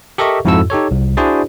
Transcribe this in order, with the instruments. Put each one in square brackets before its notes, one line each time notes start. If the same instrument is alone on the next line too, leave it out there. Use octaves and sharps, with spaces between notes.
[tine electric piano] G4 A4 A#4 D#5 E5 C#6
F2 G#2 E4 F#4 A4 E6
D#4 G4 A4 C#5
C2
D4 E4 F#4 G#4 C5 D5